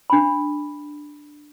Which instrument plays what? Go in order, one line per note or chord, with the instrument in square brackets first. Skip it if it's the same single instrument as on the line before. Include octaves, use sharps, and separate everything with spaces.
[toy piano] D4 B5